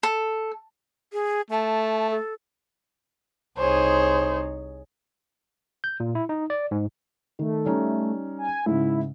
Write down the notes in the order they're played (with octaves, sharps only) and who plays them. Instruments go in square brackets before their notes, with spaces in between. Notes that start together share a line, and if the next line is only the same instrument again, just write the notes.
[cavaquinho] A4
[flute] G#4
[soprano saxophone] A3 [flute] A5
[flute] A4
[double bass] C2 D#4 [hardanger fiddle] G#4 C#5 [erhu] C5
[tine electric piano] G6
A#2
E4
D#4
D5
G#2
[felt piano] D#3 [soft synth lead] A3
[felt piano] G3 C#4 D#4
[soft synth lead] G#5
[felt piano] G#2 C#3 [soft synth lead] E4